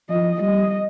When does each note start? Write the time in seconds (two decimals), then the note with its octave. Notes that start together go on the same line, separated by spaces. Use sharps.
0.09 F3 D#5
0.41 G3 D#5